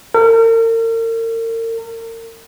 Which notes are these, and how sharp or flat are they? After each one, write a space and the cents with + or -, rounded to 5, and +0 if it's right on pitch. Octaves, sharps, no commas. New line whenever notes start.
A#4 -40